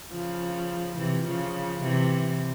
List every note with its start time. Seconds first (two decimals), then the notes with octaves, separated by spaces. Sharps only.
0.11 C#3 F3
0.97 C3 E3
1.25 C#3 F3
1.82 C3 E3